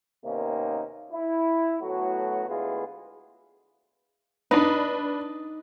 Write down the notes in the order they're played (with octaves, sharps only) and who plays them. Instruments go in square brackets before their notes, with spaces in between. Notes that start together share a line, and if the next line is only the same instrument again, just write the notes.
[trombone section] D#2 C3 A#3 B3 C#4 D#4
E4
A2 F#3 A3 B3 F#4
D2 G#3 B3 E4 F4 G#4
[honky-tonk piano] D4 B4 [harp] D#4